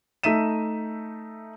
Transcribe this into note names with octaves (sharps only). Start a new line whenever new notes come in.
A3 D#4 E5 B6 D#7 E7